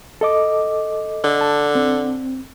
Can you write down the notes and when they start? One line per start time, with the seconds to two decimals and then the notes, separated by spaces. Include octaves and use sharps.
0.21 A4 D#5 D6
1.24 D3
1.41 A5
1.75 C4